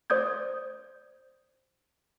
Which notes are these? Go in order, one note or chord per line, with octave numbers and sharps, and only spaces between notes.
C5 D5 D#6 G6 G#6